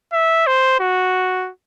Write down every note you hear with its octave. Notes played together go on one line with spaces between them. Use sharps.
E5
C5
F#4